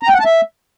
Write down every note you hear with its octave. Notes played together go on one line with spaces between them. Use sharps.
A#5
G5
F#5
A5
E5